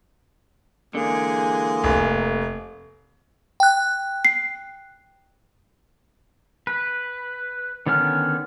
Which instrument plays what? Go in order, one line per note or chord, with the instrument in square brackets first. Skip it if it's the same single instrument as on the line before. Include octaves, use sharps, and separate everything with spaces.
[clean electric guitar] D3 [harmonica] E3 G#3 G#4 [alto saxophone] A#3
[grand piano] F1
[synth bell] G5 F#6
[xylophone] C7
[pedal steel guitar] B4
D3 D#3 B3 C#4 F6